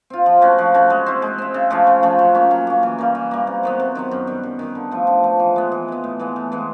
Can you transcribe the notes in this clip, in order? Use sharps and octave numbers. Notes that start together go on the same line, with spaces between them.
C4 F4
F3
A3 C#4 F#4
F3
A3 C#4 F#4
G#3
C4 E4
G#3
C4 E4
C#3
F3 A3 C#4
C#3
F3 A3 C#4
F#3
A#3 C#4
F#3
A#3 C#4
E3
G3 A#3
E3
G3 A#3
C3
D#3 F#3 B3
C3
D#3 F#3 B3
F#2
D#3 G3
F#2
D#3 G3
D3
F3 A3
D3
F3 A3
E3
G#3 B3
E3
G#3 B3
A2
E3 G#3 B3
A2
E3 G#3 B3